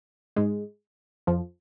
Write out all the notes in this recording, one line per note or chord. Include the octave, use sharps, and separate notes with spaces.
G#2 G#3
F2 F3